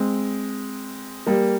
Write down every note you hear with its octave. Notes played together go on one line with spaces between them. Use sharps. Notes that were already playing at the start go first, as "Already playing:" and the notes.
Already playing: G#3 C4
G3 A#3